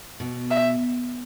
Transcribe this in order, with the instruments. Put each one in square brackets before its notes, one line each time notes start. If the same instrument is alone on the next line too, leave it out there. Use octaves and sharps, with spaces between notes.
[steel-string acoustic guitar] B2
[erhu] E5